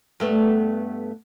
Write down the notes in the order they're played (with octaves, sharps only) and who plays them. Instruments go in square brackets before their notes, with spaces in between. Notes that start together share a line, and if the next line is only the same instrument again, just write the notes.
[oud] G2 A3 B3